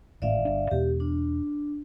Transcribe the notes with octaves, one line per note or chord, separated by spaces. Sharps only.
G#1 A2 D5 E5 F5
G1 D4
E2 B2 G4
D4